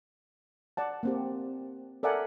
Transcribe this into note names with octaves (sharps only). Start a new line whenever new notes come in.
D5 F#5 A5
A#3 C4 G4
A4 A#4 D5 E5 F#5 G#5